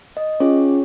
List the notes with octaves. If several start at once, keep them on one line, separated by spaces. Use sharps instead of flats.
D#5
C#4 F4 G#4 C#5